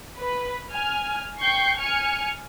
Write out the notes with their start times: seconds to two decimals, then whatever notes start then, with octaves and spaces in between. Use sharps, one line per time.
0.17 B4
0.72 G#5 F6
1.41 G5 C#6 G6 C7
1.77 G#5 F6 C#7